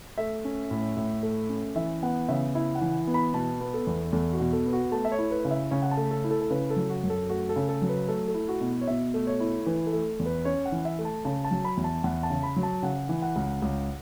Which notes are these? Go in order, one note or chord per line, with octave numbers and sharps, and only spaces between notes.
A3 E5
C#4
A2
A2
A3
C#4
E3 E5
B3 F#5
C#3 E5
E4 E5
F#5
E3
B3
B5
B2 A5
B3
A4
E2
E2 A4
F#4
B2
A4
B3
F#4
A3 A5
E5
C#5
E4
B4
C#3
E5
C#3 C#5
F#5
A5
A3
A4
E4
A4
A4
C#3 B4
A4
F#3
F#4
F#2
A4
A3 F#4
A4
C#3
A4
F#3
B4
A3 A4
A4
E4
F#4
B2
C#5
B2 E5
A3
C#5
E4
E3 B4
A4
A3
E2
B4
C#4 C#5
F#5
E3
E5
A3
A5
C#3 A5
A5
F#3
B5
E2
A5
E2 F#5
A5
C#3
B5
F#3
A5
C#3 F#5
E3
F#5
C#2
C#2